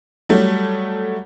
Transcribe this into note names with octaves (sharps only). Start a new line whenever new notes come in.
F#3 G3 A3